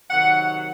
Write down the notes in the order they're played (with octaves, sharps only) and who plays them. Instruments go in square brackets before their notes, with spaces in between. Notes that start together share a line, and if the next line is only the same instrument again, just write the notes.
[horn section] C3 D#3 F#3 F#5